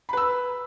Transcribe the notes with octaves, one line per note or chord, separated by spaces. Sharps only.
B4 B5 E6